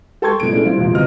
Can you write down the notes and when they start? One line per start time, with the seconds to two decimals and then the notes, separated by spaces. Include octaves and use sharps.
0.22 A4 G5 A5 C6 C#6 G#6
0.40 A#1 C3 A3 D7
0.51 G#3 A3 B3 C#4 D4 E4
0.64 F3 G3 C4 E4 F4
0.78 E1 A#1 F4
0.93 G1 C2 C4 D#5 F6